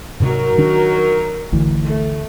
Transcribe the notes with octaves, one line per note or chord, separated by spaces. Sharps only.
G#2 C3 F#3 D#4 A#4
D#3 D4
G#1 D2 E3
A3